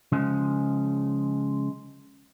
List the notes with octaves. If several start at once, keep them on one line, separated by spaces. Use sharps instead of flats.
C#3 F3 G#3